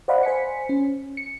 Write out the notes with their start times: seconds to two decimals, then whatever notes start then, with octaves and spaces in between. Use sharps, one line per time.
0.08 C5 D5 D#5 F5 F#5 B5
0.23 C5 G#5 B6 C#7
0.69 C#4
1.17 C#7